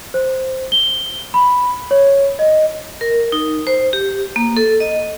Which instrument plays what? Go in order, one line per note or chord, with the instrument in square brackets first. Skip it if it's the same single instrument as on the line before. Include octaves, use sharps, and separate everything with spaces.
[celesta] C5
G7
B5
C#5
D#5
[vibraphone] A#4
D#4
C5
G4
A#3
A4
D#5